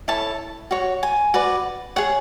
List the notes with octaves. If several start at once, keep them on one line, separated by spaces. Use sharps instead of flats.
E4 A4 C#5 A5
F#4 C#5
G#5
F#4 B4 D5
G#4 C#5 F#5